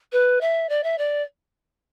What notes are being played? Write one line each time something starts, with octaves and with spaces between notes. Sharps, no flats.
B4
E5
D5
E5
D5